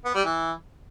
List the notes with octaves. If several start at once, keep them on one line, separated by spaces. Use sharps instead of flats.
B3
G3
E3